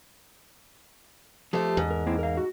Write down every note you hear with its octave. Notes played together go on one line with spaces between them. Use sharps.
F3 A3 G4 A4 C5
E2 G#2
A#4
A#3 C4 E4
A#4 F5
F#4